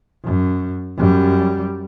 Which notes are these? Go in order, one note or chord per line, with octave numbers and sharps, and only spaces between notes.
F#2
F#2 G3